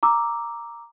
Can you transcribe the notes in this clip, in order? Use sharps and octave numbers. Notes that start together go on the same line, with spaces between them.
A#5 D6 E6